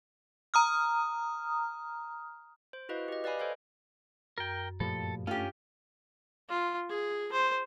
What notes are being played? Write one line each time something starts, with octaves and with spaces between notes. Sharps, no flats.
A#5 D#6 F6
C5
E4 F#4 B4 D#5 F5
G4 D#5
B4 D5 D#5 F5 G#5 B5
A4 C5 C#5 D#5 F5
F#2 A#4 G5
G2 A#2 F3 A3 A4
A3 C#4 F4 G4
F4
G#4
C5